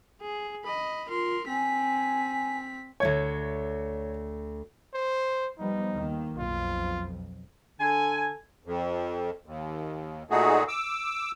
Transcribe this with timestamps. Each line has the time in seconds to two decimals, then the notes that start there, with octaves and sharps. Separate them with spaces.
0.21 G#4
0.65 D#5 B5
1.09 F4 A#4 C6
1.48 C4 G#5 B6
3.00 D2 A3 C#5 G#6
4.94 C5
5.59 F3 G3 B3 D#4
5.94 D#2 D#3 A#3
6.38 B1 F2 F4
7.80 D3 A4 G#5
8.65 F2
9.46 D#2
10.30 A#2 A3 D#4 F#4 G#4
10.68 D6 E6